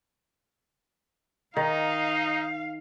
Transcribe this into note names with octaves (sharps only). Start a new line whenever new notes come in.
D#3 D#4 F5